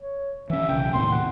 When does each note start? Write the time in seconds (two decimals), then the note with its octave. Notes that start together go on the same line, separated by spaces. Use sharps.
0.01 C#5
0.50 E3 C#4 E5
0.69 B1 C#3 G5
0.93 D#1 A2 C3 C6
1.11 F#5